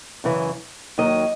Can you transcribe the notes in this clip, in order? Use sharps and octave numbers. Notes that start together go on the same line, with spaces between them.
F#2 C#3 E3
D#2 D#3 F#3 D#5